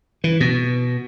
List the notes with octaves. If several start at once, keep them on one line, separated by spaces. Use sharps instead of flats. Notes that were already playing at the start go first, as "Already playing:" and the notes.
E3
B2